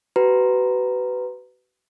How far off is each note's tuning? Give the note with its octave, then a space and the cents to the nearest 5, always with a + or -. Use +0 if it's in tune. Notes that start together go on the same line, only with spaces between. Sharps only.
F#4 +40 B4 +15 A#5 +0